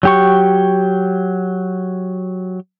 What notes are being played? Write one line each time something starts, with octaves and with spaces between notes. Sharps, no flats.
F#3 G4 C#6